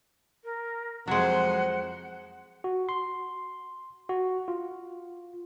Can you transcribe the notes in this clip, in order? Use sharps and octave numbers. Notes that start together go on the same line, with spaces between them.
A#4
F2 F#3 G#3 C5 F#5
F#4
C6
F#4
F4